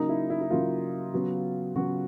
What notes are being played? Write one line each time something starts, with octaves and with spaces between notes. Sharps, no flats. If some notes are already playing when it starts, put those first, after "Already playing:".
Already playing: C#3 F#3 A#3 D#4
E4
E4
E4
C#3 F#3 A#3 F4
C#3 F#3 B3
C#3 F#3 B3 F#4